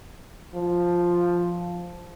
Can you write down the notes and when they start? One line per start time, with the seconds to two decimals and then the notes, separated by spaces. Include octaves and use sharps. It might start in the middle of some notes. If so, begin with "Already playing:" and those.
0.56 F3